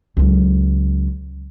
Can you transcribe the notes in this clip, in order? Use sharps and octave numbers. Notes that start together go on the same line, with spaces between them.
C#2 F#3